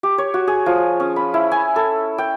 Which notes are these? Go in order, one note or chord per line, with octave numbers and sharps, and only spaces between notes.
G4
C#5
F#4
G#4
F3
C#4
B5
E4
G#5
A4
G5